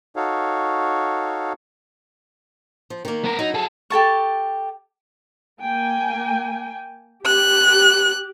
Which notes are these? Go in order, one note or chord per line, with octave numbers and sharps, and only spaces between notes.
D#4 F#4 A4 C#5 F5
F3
D#3 A#3
B3 A#4
F#3 D#4 E4
G#4 A4
G4 A4 A5 C#6
A#3 G5 G#5
G4 F#6